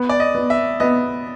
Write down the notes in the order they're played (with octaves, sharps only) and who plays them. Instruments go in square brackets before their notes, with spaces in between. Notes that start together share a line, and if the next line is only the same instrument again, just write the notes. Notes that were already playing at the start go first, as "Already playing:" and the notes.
Already playing: [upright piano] B3
[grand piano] D5
D#5
[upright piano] B3
[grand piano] E5
[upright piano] B3 [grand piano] D#5